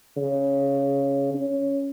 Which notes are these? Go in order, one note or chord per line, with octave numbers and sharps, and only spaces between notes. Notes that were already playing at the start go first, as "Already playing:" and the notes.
C#3
C#4